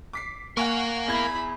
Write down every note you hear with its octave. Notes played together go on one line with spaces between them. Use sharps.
D6 B6 C7
A#3 A#4 F5 F#5 G#5 C#6
E2 E4 B5 G#6